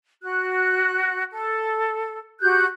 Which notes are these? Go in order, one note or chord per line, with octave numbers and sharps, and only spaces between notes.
F#4 F#6
A4
F#4 G4 F#6 G6